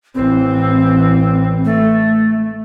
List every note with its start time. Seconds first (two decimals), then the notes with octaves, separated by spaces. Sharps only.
0.15 A1 E3 C4
1.65 A3